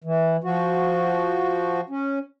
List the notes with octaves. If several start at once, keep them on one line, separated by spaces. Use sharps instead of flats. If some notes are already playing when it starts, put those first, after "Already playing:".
E3
F3 F#4
C#4